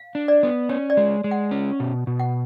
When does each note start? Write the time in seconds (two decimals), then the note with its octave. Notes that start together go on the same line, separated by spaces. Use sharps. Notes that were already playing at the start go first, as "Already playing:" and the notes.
Already playing: F5
0.15 D4
0.28 D5
0.43 B3
0.69 C#4 C#5
0.90 D5
0.97 G#3
1.24 G#3
1.31 F#5
1.51 C#4
1.80 B2
2.07 B2
2.20 F#5